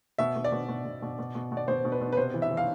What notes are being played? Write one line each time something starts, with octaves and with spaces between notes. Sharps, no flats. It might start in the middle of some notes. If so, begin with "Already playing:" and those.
B2 E5
B2
D5
B2
B2
B2
B2
B2
B2
B2
D5
B2 C5
B2
B4
B2
B4
C3 C5
E3
E5
E3
F5